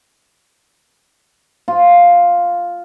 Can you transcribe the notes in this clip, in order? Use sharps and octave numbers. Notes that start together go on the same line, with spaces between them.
F4